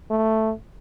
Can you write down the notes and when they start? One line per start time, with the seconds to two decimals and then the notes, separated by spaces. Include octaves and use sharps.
0.11 A3